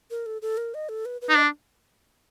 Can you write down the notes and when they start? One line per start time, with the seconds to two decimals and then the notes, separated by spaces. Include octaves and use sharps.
0.11 A#4
0.26 A4
0.42 A4
0.57 A#4
0.74 D#5
0.89 A4
1.05 B4
1.21 B4
1.29 D#4
1.36 D4 D#5